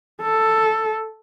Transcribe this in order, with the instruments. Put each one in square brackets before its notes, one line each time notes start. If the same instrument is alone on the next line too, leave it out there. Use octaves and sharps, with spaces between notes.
[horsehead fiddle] A4